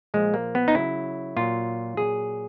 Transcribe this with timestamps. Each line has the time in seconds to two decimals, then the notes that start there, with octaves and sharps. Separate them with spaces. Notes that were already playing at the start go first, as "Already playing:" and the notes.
0.14 A#2 F3 G#3
0.34 A#3
0.55 B3
0.68 D#4
0.75 C#3 F#3 E4
1.36 A#2 F#3 F4
1.97 A#2 F#3 G#4